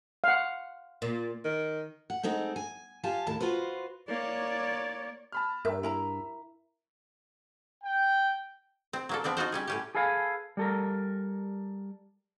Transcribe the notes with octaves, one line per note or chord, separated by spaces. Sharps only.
F5 F#5
A#2
D#3
F#5
G#3 A3 C4 D#4
G#5
F4 G4 F5 G#5 A5
D#2 A2 A5
F4 F#4 B4 C5
A#3 C#5 D5
A5 B5 F6
G2 A#4 E5
E4 A#4 A#5
G5
C4
F#3 A#3 A4
F3 B3 C4 D4
D#4 F4 F#4 C5
G3 C#4 G#4
A2 C#4 G4
G#4 A4 B4 F5 F#5 G#5
G3 A4 A#4